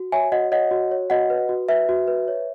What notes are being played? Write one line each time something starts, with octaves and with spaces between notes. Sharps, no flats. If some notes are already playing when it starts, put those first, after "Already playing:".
Already playing: F#4
C#5 E5 G#5
F#4 D#5 F#5
C#5 D#5 F#5
F#4
C#5
F#4 D#5 F#5
B4
F#4
B4 E5
F#4
B4
C#5